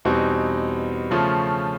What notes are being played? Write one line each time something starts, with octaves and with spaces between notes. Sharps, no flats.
E2 B2 G3 C4 D#4
C#3 F3 A3 C#4 F4